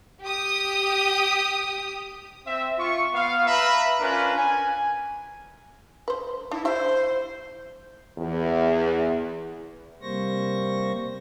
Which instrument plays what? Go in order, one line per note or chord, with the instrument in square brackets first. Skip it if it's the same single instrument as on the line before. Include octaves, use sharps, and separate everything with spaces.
[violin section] G4 D#6
[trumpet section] C4 E5
F4 C#6
B3 F5
B4 E5 F5 A#5 B5
C#4 D4 F4 A#4 B4
G#5
[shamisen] B4 C5
[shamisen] D4 [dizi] E4
[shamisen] E4 G4 E5 [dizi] C5
[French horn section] E2
[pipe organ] C3 G3 A#3 C5 C#6 A#6